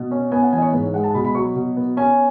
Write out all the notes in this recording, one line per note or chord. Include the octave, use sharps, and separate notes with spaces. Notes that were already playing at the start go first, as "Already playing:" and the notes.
Already playing: B2
C#4
B3 G#5
F#5
E3 G#5
D#5
C#5
G#2 B4
C#5
G#3 F#5
A5
B2 B5
B5
F#3 C#6
B2
B3
C#4 G#5